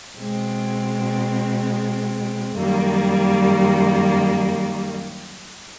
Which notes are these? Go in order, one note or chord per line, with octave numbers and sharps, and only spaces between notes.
B2 G#3 C4
F#2 D#3 G3 A#3